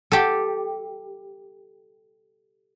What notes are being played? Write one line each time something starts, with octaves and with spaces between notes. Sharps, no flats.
G4 A4